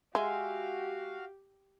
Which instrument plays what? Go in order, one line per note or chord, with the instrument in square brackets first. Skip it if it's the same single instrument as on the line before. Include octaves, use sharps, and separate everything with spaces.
[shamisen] G#3 [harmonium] F#4 F5 [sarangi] G4 [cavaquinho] E5 G#5 C6